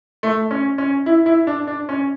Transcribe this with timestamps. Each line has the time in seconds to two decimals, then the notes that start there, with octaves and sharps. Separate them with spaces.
0.23 A3
0.51 C#4
0.78 C#4
1.06 E4
1.26 E4
1.47 D4
1.67 D4
1.89 C#4